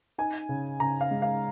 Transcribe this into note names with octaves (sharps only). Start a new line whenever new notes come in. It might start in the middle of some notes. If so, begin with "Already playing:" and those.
D#4 G#5
C#3
C#3 A#5
F5
G#3
F5